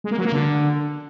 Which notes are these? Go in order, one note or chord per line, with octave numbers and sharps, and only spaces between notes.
G#3
A#3
F#3
A#3
D3